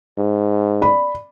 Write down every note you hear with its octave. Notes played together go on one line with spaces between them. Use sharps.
G#2
D5 B5